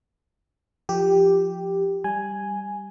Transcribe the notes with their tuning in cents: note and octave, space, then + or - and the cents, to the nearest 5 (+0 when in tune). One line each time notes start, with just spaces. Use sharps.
F3 +0 G4 +0
G3 +5 G#5 +0